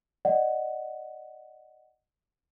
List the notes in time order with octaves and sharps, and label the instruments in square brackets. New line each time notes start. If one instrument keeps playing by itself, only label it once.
[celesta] D5 D#5 F#5